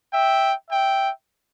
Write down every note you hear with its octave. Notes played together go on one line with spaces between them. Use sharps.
E5 G5
E5 G5